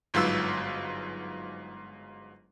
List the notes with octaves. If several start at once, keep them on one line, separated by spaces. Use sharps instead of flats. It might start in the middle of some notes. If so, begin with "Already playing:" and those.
G1 G#2 F#3 F4 B4 E6